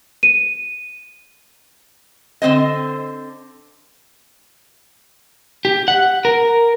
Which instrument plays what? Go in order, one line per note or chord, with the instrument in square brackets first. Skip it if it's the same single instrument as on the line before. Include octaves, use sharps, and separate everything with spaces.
[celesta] D#7
[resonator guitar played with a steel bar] D3 C4 C5 D#5
[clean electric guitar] G4
F#5
A#4